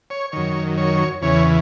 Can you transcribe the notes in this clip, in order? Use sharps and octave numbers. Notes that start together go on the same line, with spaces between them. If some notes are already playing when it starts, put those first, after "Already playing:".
C#5
F#2 D#3 C#5
C#5
E2 C#3 E3 C#5